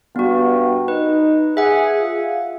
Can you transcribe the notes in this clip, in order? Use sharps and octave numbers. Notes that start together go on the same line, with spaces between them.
G2 B3 F#4
D#4 B4
G#4 E5 F#5
F4